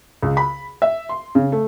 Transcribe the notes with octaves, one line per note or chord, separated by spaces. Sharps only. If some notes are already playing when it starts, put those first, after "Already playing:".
C#2
B5
E5
C6
C#3
A3